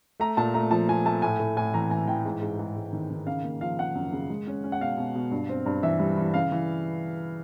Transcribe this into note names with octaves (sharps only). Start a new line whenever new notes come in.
A3 A#5
A#2 A5
A3 A#5
F3 A5
F3 G#5
A3 A5
A2 G#5
A2
A2 G#5
E3 A#5
E3 G#5
E3 G5
G#2
G#2
G#2
G#2
D#3
D#3
C#3 F5
A#3
F3 F5
C#3 F#5
F#2
C#3
G#3
C#4
C#4
F#5
B2 F5
B2
B2
G2
C4
G2
E3 E5
G3
E3
C#3 F5
E3